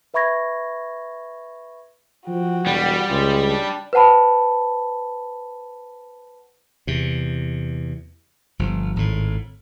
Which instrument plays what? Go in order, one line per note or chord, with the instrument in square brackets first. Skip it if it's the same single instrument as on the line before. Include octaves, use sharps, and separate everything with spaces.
[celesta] B4 E5 B5 C#6 G#6 A#6
[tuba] F3 [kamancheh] F#4 G5
[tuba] E1 [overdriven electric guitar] G3
[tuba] C#2 [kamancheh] F4 G#4
[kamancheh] D4
[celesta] B4 C5 F#5 A5 B5
[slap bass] E2 C3
G1 F3
G#1 A2